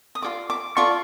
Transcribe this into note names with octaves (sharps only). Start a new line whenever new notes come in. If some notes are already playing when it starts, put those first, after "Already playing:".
D#6
F4 A4 D5 D6
D6
F4 A4 D5 C#6